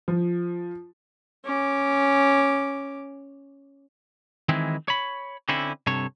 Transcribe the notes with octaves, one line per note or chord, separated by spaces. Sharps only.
F3
C#4 D6
D#3 E3 G#3 C4 E4
C#5 B5
D3 C4 C#4 E4
G2 C3 A4 C#5